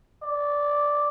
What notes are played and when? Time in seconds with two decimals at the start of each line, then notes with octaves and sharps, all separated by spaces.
0.23 D5